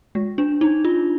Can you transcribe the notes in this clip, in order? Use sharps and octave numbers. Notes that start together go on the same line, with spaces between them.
G#3
D4
D#4
F4